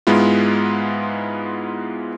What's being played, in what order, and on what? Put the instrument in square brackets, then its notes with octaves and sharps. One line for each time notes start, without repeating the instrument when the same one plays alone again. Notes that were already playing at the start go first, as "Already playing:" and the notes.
[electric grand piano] G#2 G#3 B3 E4 F4